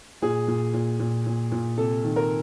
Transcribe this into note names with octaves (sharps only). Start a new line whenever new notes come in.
A#2 G#4
A#2
A#2
A#2
A#2
A#2
C3 A4
D#3
A#4